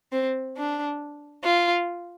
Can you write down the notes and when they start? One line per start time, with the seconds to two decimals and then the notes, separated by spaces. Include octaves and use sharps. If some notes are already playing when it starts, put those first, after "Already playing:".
0.12 C4
0.57 D4
1.44 F4